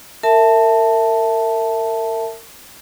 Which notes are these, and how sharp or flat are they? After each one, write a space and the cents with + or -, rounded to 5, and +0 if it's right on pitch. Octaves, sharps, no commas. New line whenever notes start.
A#4 -35 E5 +0 A5 +0